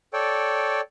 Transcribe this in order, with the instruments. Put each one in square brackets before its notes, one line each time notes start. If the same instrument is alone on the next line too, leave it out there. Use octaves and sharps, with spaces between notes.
[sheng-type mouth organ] A4 C#5 D5 G5